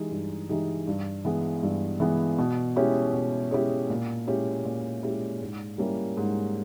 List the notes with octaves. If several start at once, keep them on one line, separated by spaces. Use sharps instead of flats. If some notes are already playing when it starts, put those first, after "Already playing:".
Already playing: E3 G#3 D#4 G4
G2
E3 G#3 D#4 G4
G2
E3 G#3 B3
G2
E3 G#3 B3
B2
G#3 C#4 E4 G4
B2
G#3 C#4 E4 G4
A#2
G#3 C#4 E4 G4
A#2
G#3 C#4 E4 G4
G#2
G3 A#3 C#4 E4
G#2